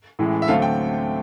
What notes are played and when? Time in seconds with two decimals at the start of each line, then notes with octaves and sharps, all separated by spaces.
0.19 A1 A2 E3 G#3
0.42 E5
0.48 D2 D3 F#3 A3 C4 F5
0.62 G5